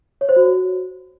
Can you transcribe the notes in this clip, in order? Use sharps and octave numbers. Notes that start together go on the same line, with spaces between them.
C#5
C5
F#4